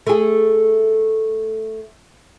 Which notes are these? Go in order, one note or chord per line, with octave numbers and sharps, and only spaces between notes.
A3 G#4